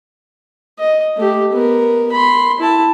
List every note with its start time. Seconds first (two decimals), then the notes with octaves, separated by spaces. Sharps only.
0.79 D#5
1.17 A3 G4
1.53 B3 A#4
2.12 B5 C6
2.60 E4 A5